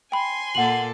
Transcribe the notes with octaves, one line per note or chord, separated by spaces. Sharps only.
G5 G#5 B5 C6
A#2 A#3 A4 F#5 F#7